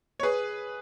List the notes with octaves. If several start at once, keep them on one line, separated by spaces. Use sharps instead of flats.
C#5
G#4 B4